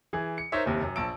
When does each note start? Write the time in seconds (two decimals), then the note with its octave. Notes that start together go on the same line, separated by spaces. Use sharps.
0.13 E3 G#4
0.38 C#7
0.52 D#4 A#4 C5 C#5 D#5 E5
0.66 F#1 D#2 C3
0.83 F#2
0.96 A#1 A5 E6 D7